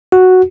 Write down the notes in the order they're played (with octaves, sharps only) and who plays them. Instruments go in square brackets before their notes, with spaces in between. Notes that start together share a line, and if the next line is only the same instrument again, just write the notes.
[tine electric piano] F#4